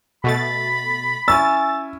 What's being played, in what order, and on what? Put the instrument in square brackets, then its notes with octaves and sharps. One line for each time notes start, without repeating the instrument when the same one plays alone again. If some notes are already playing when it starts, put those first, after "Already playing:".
[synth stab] B2 A3 A6 [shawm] B5
[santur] C#4 E4 G#5 [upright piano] E6 [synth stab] A6